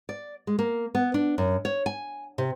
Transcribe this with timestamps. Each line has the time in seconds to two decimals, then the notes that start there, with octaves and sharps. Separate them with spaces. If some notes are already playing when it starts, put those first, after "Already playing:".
0.09 D5
0.47 G#3
0.59 A#3
0.95 B3
1.14 D4
1.38 F#2
1.65 C#5
1.86 G#5
2.38 C3